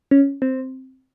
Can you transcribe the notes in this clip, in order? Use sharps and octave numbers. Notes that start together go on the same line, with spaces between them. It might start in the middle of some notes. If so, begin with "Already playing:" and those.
C#4
C4